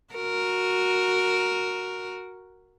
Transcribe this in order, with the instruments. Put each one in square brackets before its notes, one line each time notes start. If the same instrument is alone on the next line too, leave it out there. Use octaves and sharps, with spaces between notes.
[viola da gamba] F#4 A#4